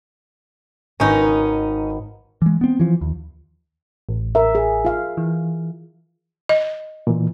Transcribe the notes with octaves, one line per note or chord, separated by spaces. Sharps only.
G#1 C#4 D#4 B4
E3 G#3
B3 C4
E3 F3
D#2
A1
A#4 E5
G#4
F4 F5
E3
D#5
A#2 E3